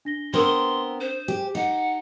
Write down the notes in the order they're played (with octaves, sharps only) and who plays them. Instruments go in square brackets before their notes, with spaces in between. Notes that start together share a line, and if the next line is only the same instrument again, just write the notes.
[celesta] D4 A#6 G7
[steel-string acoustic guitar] B3 C4 A#4 [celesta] D4 D#6 E6 [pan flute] C6
[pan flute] C5
[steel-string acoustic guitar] G4 [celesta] G#5
[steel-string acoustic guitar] D#4 [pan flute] F#5